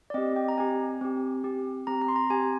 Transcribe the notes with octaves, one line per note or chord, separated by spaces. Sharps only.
D5
C4 G4 D#5
G5
A#5
C4 G4 G#5
C4 G4
C4 G4
C4 G4 A#5
A#5
C6
A#5
C4 G4 G#5